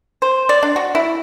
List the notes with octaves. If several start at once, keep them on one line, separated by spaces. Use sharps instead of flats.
C5
D5
D4
F#4
E4